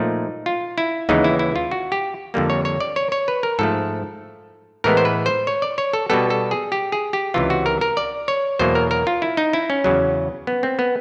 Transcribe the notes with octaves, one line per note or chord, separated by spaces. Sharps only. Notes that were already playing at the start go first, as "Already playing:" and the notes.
Already playing: A#2 F3 A3 D#4
F4
E4
D#2 C#3 E3 G#3 B3 D#4
E4
E4
F4
F#4
G4
F2 D3 G3 A#3
C#5
C#5
D5
C#5
C#5
B4
A#4
G#2 F3 A3 A4
A2 E3 G#3 B3 A#4
C5
B4
C5
C#5
D5
C#5
A4
B2 G3 B3 A4
A4
G#4
G4
G#4
G4
C#2 C3 E3 F4
F#4
A#4
A#4
D5
C#5
E2 B2 F#3 A#3 C5
A#4
A#4
F4
E4
D#4
E4
C#4
E2 C#3 F#3
B3
C4
B3